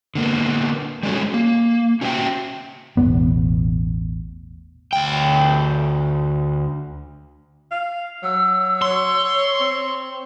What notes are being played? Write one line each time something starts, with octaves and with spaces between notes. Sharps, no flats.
D3 A#3 B3
G3 G#3 C#4 F#4 A4
A#3
C#4 F#4 C5 E5 G5
E1 A1 C3 B3
D2 G5
F5
F#3 E6
C#5 C6
C4